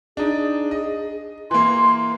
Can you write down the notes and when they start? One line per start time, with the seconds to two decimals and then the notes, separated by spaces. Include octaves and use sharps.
0.17 D4 D#4 G#4
0.71 D#5
1.51 E3 A#3 C6